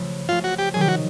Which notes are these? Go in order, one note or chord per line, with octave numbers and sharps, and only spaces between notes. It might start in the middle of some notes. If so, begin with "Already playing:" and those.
Already playing: C#3 F3 A3
C#3 F3 A3 F4
F#4
G4
C3 D#3 F#3 G#4
G4
F#4